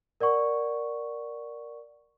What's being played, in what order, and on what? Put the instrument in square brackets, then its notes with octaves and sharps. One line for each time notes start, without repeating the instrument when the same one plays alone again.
[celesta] A#4 D5 F#5 C#6